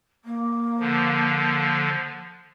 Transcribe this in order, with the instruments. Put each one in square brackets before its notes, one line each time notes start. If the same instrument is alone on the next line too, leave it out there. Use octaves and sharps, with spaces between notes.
[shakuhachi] A#3
[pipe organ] D3 F3